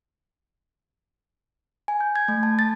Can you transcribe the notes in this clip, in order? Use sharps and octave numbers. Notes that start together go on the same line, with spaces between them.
G#5
G6
G#6
A3
A5
A6